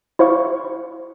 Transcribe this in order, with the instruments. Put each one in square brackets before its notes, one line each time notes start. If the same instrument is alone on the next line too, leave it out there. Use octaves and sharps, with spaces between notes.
[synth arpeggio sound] E4 C5 F5 C#6